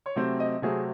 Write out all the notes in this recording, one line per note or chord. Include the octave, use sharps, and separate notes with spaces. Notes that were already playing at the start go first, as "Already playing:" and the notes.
C#5
C3 F#3 A3 C4 C5
D#5
C3 F#3 A3 C4 G#4